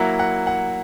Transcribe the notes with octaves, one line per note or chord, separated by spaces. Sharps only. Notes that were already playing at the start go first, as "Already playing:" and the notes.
Already playing: F#3 A#3 E4 F#5
F#5
F#5